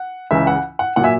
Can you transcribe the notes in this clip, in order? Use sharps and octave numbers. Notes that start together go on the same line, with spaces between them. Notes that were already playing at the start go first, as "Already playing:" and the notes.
Already playing: F#5
C#2 C#3 E3 E5
F#5
F#5
A#2 F#3 F#5
E5 G#5